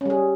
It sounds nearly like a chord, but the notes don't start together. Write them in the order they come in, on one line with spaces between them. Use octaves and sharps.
C#4 G3 G#4